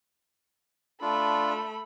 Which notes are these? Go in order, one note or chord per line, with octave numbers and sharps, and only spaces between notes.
A3 D4 F4 B5